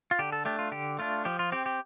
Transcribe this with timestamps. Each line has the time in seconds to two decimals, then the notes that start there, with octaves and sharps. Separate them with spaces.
0.11 F4
0.19 D3 G4
0.32 A4
0.45 A3 D4 G4
0.59 F4
0.72 D3 G4
0.99 A3 D4 F4
1.25 F3 G4
1.39 F4
1.52 C4 G4
1.66 G4